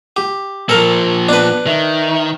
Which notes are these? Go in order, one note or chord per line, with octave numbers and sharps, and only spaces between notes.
G4
A#2 F3 A4 A#4
B3 D4 B4
D#3 E5